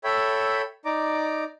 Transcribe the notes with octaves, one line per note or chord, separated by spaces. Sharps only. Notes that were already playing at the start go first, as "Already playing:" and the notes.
A4 C#5 E5 G5 B5
D#4 D5 A#5 D6